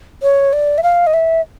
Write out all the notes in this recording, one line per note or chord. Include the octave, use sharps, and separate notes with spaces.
C#5
D5
E5
F5
D#5
E5